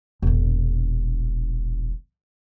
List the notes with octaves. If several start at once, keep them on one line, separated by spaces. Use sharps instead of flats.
E1 A#1